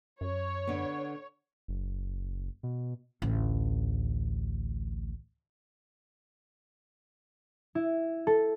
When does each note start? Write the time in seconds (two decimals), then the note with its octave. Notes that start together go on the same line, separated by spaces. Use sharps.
0.21 F#2 C#5
0.67 D3 B3
1.68 F#1
2.63 B2
3.22 A1 D2
7.75 E4
8.27 A4